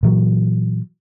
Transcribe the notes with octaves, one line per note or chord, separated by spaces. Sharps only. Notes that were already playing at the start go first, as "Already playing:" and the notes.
A#2 E3 F#3